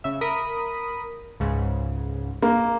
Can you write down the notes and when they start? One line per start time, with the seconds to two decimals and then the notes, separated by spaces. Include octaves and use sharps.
0.04 C#3 E5
0.21 A#4 B5 D#6
1.40 C#2 G#2 C#3
2.42 A#3